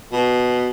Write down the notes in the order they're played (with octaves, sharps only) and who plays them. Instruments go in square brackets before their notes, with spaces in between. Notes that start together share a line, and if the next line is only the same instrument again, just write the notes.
[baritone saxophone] B2